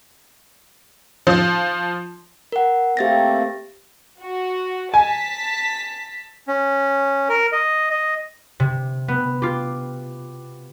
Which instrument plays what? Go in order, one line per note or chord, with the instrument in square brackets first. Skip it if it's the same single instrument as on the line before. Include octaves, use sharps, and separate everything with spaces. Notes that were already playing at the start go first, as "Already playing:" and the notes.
[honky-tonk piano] F3
[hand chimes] A#4 F#5
[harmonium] A3 A#3 C4 [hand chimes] G4 A6 A#6
[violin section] F#4
[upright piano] G#5 [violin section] A5 B6
[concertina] C#4
A#4
D#5
D#5
[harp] C3
B3
F4 G4